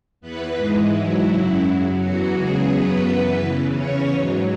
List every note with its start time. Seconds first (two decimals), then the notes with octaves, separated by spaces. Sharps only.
0.21 E2 E3 B3 B4
0.56 G#2 E3 G#3 G#4
0.92 G#2 F#3 E4
1.28 F#2 C#3 F#3 E4
1.63 F#2 F#3
1.98 E2 E3 F#3 F#4
2.33 E2 C#3 F#3 G#3 G#4
2.69 F#2 C#3 F#3 B3 B4
3.04 F#2 E3 B3 B4
3.40 E2 C#3 E3
3.74 E2 C#3 E3 C#4 C#5
4.10 G#2 F#3